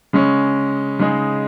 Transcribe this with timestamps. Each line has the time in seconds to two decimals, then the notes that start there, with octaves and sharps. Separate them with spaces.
0.13 C#3 G#3 C#4
0.99 C#3 G#3 D#4 G#4